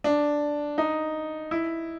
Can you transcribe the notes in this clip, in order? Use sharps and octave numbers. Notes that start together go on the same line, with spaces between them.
D4
D#4
E4